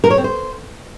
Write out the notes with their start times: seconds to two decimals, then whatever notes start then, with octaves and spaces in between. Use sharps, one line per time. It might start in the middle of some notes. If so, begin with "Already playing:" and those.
0.04 A#4
0.11 C#5
0.17 C4
0.24 C5